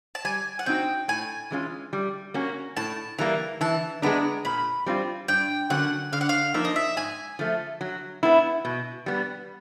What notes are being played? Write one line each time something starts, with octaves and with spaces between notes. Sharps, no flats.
A5
G3 G#5
F#5
C4 D#4 F#4 G5
A2 G#5
E3 G#3 C#4 F4
G3
A#3 C#4 F#4
A2 A5
E3 G3 A#3 A#5
E3 A5
G#3 B3 D4 A#5
A#2 B5
G3 C4 F4
G2 G5
D3 F#3 A#3 C#4 F#5
D3 F5
F#5
F5
F3 A#3 D#4 E5
D#5
E5
G#2 G#5
F3 A3
F#3
B3 E4
B2
G3 B3